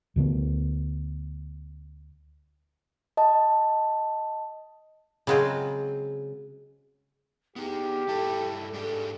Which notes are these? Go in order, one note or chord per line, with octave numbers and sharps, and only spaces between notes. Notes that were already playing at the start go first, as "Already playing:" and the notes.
D2 D3 D#3 B3
D#5 A5
C#3 F#3 G#3 C4 F4
B3 D#4 G4 G#4
G2 E4 A4 A5
G#2 D4 G4 A4